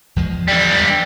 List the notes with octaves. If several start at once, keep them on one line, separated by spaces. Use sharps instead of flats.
E2 F3 G#3
D3 G3